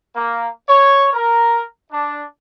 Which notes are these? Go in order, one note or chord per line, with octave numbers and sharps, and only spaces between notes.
A#3
C#5
A#4
D4